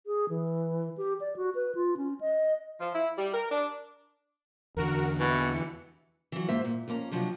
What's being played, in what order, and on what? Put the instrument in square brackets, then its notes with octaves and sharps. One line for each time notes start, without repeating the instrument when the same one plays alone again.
[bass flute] G#4
E3
G4
D5
F#4
B4
F4
C#4
D#5
[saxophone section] F3
E4
G3
A#4
D4
[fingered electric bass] E2 D3 [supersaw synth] F#4 A#4
[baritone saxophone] B2 [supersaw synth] E3 C#7
[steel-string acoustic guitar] E3 F#3
G#2 A#3 C5 E5
A#2
F2 A#3 C#4 A#5
C3 F3 F#3 D4